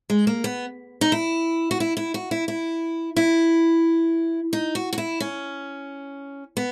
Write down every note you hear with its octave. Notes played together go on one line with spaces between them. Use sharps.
G#3
A#3
B3
D#4
E4
F#4
E4
E4
F#4
E4
E4
E4
D#4
F#4
F#4
E4
C#4
B3